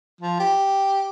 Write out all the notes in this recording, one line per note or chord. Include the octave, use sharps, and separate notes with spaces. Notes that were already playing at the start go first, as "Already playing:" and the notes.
F3
G4